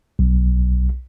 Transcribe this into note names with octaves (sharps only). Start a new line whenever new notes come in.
B1